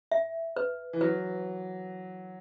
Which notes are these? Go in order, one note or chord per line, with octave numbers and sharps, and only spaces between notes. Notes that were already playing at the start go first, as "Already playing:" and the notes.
E5
B4
E3
F#3 B4